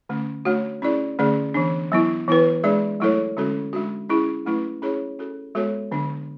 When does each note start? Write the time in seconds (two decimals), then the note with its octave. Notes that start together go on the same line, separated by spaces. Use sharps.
0.09 D3 A3 C#4
0.45 A3 D4 F#4 C#5
0.82 C#4 E4 G#4 D5
1.19 D3 A3 C#4 G#4 D5
1.54 E3 B3 D4
1.92 F#3 B3 E4
2.28 E3 B3 E4 B4
2.63 G#3 D4 G#4 D5
3.00 F#3 A3 E4 A4 C#5
3.37 D3 G#3 C#4 F#4 A4
3.73 G#3 D4 F#4
4.09 C#4 E4 G#4
4.45 F#3 A3 C#4 E4 B4
4.82 C#4 E4 G#4 C#5
5.19 C#4 F#4 A4
5.55 G#3 B3 F#4 A4 C#5
5.91 D3 F#3 B3 D4